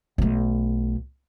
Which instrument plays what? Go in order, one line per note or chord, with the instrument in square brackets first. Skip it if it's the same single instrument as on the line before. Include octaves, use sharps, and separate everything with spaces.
[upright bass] B1 A3